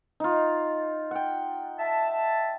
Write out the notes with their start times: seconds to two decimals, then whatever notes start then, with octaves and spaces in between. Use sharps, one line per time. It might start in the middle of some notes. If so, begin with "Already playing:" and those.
0.20 D#4 F4
1.11 F#5 G5
1.79 E5 A5